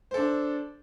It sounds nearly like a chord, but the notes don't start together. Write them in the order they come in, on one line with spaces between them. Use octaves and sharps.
C5 A4 D4